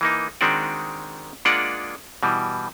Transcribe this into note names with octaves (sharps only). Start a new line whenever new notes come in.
E3 A#3 D#4
D#3 G#3 C4 D4 F#4 D5
G#3 A#3 D4 F4 D5 F#5
B2 E3 G3